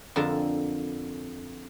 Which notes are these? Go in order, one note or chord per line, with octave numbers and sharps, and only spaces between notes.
F2 D3 A#4 A5